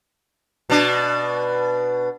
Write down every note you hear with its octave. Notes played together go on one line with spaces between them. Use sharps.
B2 D4